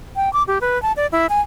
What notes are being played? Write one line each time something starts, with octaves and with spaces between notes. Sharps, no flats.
G5
D6
G4
B4
A5
D5
E4
G#5